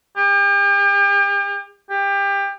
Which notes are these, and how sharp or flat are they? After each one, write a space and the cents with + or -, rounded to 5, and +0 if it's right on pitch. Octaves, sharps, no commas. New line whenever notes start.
G4 +40
G4 +25